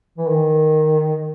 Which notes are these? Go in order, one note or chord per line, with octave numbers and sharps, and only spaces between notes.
E3
D#3